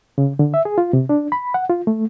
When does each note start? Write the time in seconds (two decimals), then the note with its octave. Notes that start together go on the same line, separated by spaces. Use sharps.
0.18 C#3
0.39 D3
0.54 E5
0.65 G#4
0.78 F4
0.93 C3
1.09 D4
1.32 B5
1.54 F#5
1.69 F4
1.87 A3